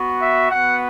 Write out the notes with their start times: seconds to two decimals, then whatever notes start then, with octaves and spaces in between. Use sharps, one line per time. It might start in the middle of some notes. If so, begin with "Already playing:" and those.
Already playing: B3 F#4
0.22 E5
0.51 B3 F#4 F#5